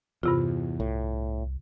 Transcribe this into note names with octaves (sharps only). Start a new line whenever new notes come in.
E2 G2 C3 F4
C2 A2